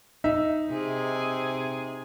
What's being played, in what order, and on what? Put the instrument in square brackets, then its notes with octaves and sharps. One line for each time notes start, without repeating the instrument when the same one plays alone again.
[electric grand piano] D#4 [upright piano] E5
[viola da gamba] C3 G#4